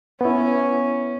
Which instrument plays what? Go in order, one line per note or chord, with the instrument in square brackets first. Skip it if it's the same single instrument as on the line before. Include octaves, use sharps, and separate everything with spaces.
[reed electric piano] B3 E4 [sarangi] C#4